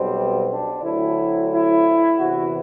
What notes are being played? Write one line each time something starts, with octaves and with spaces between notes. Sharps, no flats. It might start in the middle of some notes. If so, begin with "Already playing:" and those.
Already playing: B1 B2 G3 C4
D4
D2 D3 F#3 C4 E4
E4
E2 C3 E3 F#4